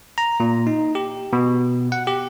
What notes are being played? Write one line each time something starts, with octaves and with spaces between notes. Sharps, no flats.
A#5
A#2
D#4
G4
B2
F#5
G4